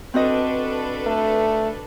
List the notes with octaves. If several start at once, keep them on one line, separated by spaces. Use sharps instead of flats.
C4 D4 F#4 A4 B4 D#5
A3